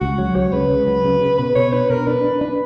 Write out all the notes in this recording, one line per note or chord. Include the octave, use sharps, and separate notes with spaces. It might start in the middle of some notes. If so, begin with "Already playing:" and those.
C#2 F#4
F#3
C#2 C#5
C#3 B4
C#2
F#3
C#3
C#3
B2 B4
B2 C#5
D4 B4
B2 A#4
D4 B4
D4
D4 B4